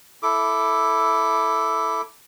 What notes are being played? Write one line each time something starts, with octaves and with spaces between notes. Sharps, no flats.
E4 A4 D6